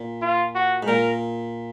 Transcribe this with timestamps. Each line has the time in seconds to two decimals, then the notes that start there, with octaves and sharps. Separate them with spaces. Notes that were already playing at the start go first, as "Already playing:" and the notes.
Already playing: A#2
0.22 F4
0.55 F#4
0.83 G#2
0.87 A#2 A#4